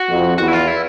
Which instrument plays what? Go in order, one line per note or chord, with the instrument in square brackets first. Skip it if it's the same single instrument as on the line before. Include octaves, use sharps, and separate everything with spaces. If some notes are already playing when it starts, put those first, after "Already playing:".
Already playing: [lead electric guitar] F#4
[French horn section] F2
[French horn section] E2 [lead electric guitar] F#4
[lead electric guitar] E4
F4
E4